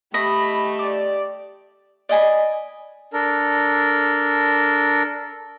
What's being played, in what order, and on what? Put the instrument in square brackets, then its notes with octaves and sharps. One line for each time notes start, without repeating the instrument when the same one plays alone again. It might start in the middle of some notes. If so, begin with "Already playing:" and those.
[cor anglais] A3 [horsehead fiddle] G4 [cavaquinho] D#5 [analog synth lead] B5
[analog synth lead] D5
[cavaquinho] D5 D#5 G#5 B5
[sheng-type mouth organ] D4 A4 A#4